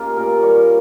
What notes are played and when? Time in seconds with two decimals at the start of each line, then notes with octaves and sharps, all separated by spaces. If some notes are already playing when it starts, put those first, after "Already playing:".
Already playing: A#3 C#4 D#4 F4 G4
0.17 A#2 A#4
0.42 G3 C#5